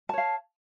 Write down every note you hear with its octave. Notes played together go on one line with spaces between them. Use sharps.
C#5 F5 A5